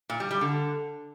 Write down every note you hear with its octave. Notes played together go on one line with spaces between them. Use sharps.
A#2
G3
G3
D3